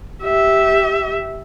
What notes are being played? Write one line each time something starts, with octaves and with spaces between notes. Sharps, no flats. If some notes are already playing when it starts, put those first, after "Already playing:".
G4 E5